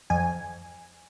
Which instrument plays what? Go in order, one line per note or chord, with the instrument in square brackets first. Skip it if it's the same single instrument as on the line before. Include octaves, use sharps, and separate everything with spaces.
[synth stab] F2 G#5